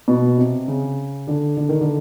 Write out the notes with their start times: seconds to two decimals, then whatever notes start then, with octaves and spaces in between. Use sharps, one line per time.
0.08 B2
0.38 C3
0.68 C#3
1.27 D3
1.57 D3
1.69 D#3
1.81 D3